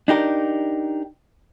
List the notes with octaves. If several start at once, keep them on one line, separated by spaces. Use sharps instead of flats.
D4 D#4 G4 A#4